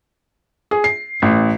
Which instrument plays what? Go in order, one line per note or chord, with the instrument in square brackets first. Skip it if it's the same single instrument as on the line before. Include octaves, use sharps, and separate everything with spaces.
[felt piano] G#4
C7
A1